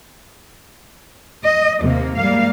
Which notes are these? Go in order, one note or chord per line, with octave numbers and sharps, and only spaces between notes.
D#5
D#2 C3 A#3
G#2 G3 A#3 F5